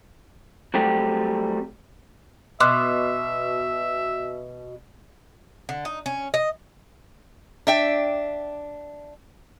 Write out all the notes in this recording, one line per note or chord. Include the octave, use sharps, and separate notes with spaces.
F#3 G3 A3 C4 G4
B2 E5 C6 D6 F#6
D3
D#4
C#4
D#5
D4 E5 G5